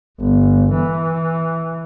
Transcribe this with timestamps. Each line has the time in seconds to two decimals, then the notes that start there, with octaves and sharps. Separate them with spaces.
0.20 G1
0.73 E3